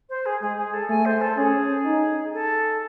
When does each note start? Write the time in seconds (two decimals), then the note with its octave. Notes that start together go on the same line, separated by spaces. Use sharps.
0.09 C5
0.26 G#4
0.41 G#3 G#4
0.57 G#4
0.73 A4
0.89 A3 G#5
1.05 C5
1.21 A4
1.38 C#4 G#4
1.86 D#4
2.33 A4